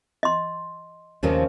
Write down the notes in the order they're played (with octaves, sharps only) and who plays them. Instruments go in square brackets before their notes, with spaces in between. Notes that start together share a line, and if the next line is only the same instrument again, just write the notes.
[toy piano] D#5 C6
[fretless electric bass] D#2 [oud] C3 F3 A3 [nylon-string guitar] C#4 A#4 D#5